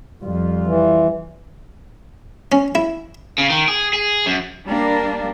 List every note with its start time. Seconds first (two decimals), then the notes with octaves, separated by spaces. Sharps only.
0.23 F2 G3 F4
0.67 E3
2.52 C#4
2.75 E4
3.38 C#3
3.50 D#3
3.68 G#4
3.93 G#4
4.26 F#2
4.66 G3 A#3 D4